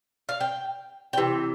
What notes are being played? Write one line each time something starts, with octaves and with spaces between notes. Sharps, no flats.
F5
G5
G5
C3 E3